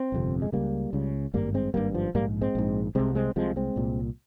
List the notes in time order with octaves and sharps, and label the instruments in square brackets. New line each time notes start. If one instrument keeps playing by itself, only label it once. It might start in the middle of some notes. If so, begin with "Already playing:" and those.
Already playing: [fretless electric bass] C4
G1 F2 C3
G#3
C#2 C#3 G3 A#3
C#2 C#3
G#1 G2 G3 A#3
G#3 C4
G#1 G2 G3 A#3
F3
A#1 G#2 G3 A#3
G#3 C4
A#1 G#2
C2 C3 G#3 C4
G#3 C4
C2 C3 F3 G#3
G#3 C4
C2 A#2